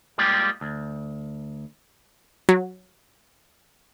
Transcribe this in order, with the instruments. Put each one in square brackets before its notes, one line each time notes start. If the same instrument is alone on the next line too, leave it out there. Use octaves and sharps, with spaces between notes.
[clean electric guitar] G3 G#3 A#3 F4 G4
D2
[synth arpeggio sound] F#3